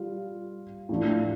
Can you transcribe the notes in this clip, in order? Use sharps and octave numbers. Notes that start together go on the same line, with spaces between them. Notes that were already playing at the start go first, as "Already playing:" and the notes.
Already playing: G3 F4
A2 F3 A3 D4 F4